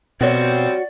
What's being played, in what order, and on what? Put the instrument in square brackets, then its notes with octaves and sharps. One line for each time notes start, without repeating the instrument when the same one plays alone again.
[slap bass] B2 [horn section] F3 G3 C4 [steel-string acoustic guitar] F#4 C#5 [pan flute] D5